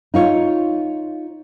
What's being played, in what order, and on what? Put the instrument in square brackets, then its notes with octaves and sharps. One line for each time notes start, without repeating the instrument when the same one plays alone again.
[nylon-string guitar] D#4 F4 C#5